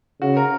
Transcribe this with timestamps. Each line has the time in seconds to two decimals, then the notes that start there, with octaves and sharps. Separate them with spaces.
0.22 C#3 F#4
0.37 A#4